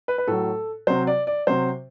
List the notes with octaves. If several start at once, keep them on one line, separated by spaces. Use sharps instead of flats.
B4
B4
A2 F#3 A4
C3 F#3 C5
D5
D5
C3 F#3 C5